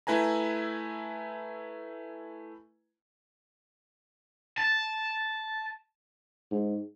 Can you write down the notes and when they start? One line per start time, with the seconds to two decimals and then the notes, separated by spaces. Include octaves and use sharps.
0.07 A3 E4 B4 G#5 A#5
4.58 A5
6.51 G#2